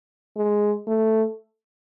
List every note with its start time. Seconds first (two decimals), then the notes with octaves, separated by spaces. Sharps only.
0.37 G#3
0.87 A3